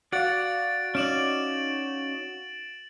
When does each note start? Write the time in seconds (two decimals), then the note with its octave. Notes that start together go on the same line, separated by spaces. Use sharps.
0.12 F#4 D5 F5 F#5 A6 D7
0.95 C#4 D#4 D5 D7 E7 F#7